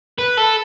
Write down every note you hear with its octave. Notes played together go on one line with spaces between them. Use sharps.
B4
A4